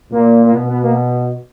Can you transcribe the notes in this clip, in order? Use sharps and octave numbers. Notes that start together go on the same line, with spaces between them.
A#2 A#3
A#3
B2 B3
B3
A#3